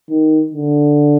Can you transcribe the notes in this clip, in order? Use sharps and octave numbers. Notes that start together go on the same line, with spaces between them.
D#3
D3